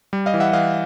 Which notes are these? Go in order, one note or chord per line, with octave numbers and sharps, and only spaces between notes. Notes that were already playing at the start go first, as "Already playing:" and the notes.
G3
D#5 F5
E3
E5 F#5
E3 D#5 F5